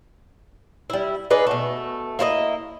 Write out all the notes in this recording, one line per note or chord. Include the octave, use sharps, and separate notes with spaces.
G3 E4
D#4 G#4 B4 D5
B2 A3
A#3 E4 F#4 D#5